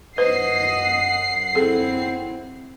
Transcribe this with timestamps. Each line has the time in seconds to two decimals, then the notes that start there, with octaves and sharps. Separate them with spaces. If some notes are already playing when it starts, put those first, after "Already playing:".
0.18 F#2 B4 C5 D#5 F#5 C7
1.55 C4 E4 G#4 A4